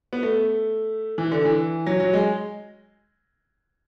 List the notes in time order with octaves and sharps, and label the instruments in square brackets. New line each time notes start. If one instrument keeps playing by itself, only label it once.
[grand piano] B3
A3
E3
D3
E3
F#3
F#3
G#3